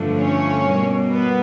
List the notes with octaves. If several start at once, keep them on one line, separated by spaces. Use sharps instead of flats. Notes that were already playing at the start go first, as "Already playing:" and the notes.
Already playing: G2 D3 F3 A3
C#4 C#5
B2 G3 A#3
B3 B4